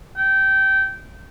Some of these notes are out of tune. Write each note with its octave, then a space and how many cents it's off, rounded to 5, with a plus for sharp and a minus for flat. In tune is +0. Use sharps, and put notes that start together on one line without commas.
G5 -20